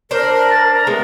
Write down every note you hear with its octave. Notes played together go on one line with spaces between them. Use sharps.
D4 A#4 C5
A6
A#4 A#5
G#3 A3 B3